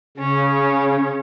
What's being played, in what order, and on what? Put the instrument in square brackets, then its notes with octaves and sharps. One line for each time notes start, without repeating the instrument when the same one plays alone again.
[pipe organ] C#3 [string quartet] C#4